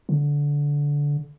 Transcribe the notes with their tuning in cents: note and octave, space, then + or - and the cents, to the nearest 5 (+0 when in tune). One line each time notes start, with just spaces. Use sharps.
D3 -15